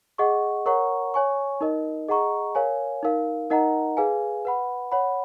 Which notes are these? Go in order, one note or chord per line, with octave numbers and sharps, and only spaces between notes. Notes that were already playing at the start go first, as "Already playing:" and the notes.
G#4 D#5 F#5 C#6
A#4 C#5 F#5 A#5 C#6
C#5 G#5 C#6
D#4 A#4 D#5
G#4 D#5 F#5 A#5 C#6
A#4 C#5 F5 G#5
D#4 A#4 F5
D#4 A#4 D#5 F#5 A#5
G#4 B4 F5 G#5
B4 F#5 B5
C#5 F#5 B5